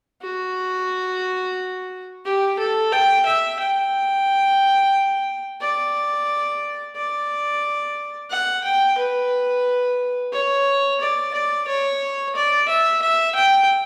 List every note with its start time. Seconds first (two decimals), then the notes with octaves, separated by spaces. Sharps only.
0.22 F#4
2.25 G4
2.59 A4
2.92 G5
3.25 E5
3.59 G5
5.61 D5
6.96 D5
8.30 F#5
8.64 G5
8.98 B4
10.32 C#5
11.00 D5
11.33 D5
11.67 C#5
12.35 D5
12.68 E5
13.02 E5
13.35 G5